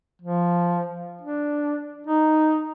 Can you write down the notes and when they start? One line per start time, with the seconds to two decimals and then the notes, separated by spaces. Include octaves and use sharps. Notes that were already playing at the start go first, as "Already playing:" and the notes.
0.22 F3
1.21 D4
2.07 D#4